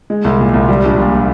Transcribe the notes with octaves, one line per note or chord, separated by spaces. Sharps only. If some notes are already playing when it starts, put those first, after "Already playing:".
G#3
C2
A#2
C2
G3
A#1
A#2